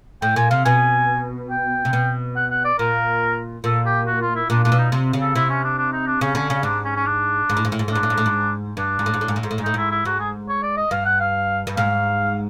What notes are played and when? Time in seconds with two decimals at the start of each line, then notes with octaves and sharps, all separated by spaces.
0.22 A2 G5
0.36 A#2 G#5
0.51 C3 F5
0.65 B2 G#5
1.51 G5
1.85 C3
1.93 B2
2.36 F#5
2.51 F#5
2.65 D5
2.79 A#2 A#4
3.64 A#2 A4
3.86 G4
4.07 F#4
4.21 F4
4.36 E4
4.50 A#2 D4
4.64 A#2 D4
4.72 B2
4.78 D#4
4.92 C3
5.13 C#3
5.21 A4
5.35 C3 E4
5.50 C#4
5.64 D4
5.78 D4
5.92 D#4
6.07 D4
6.21 C#3 C#4
6.35 D3 C#4
6.49 C#3 C#4
6.63 G#2 D4
6.85 C#4
6.96 C#4
7.06 D4
7.49 G#2
7.57 A2
7.65 G#2
7.72 A2
7.79 G#2
7.88 A2
7.92 G#2 D4
8.03 A2
8.10 G#2
8.18 A2
8.26 G#2
8.77 G2 D4
8.99 G#2
9.06 A2
9.14 G#2
9.21 A2
9.28 G#2
9.36 A2
9.43 G#2
9.51 A2
9.58 G#2
9.63 A2 D#4
9.74 G#2 E4
9.91 E4
10.05 G#2 F#4
10.20 G#4
10.49 C#5
10.63 D5
10.77 D#5
10.91 G2 F5
11.05 F#5
11.20 F5
11.67 G2
11.77 G#2 F5